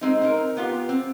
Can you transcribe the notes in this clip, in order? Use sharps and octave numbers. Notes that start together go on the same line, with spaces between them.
G#3 C4 D#4
C4 D#4 A#4
B3 F4 G4
C4